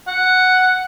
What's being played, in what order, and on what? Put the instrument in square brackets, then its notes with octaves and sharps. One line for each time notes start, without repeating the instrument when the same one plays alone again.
[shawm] F#5